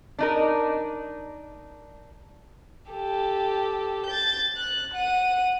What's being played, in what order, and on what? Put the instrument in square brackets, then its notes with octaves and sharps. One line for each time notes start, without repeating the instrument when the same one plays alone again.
[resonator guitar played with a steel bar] D4 D#4 A#4
[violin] G4 A4
G6 A6
F#6
F#5 D#7